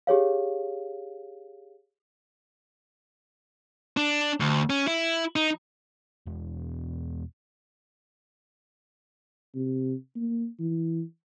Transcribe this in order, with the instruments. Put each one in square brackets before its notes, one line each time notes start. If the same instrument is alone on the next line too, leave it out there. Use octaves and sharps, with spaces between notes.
[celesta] G4 G#4 C#5 F5
[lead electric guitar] D4
D2
C#4
E4
D#4
[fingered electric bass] E1
[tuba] C3
A#3
E3